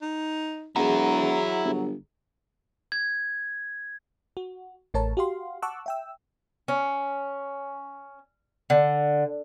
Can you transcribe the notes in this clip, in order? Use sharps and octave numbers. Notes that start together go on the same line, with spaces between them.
D#4
E1 F#3 E4 G#4 F#5 A#5
G1
G#6
F#4
A1 A3 A#4 C#5 A5
F#4 G4 F5 C6
F#5 A5 C#6 D6 E6 F#6
E5 G5 E6
C#4
D3